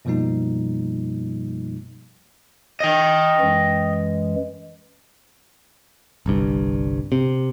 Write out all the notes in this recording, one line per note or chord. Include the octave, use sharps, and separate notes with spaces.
F#2 B2 F3 G3 A#3 D#4
D#5 G5
F#2 E3 G#3
G1 C2 G2
C3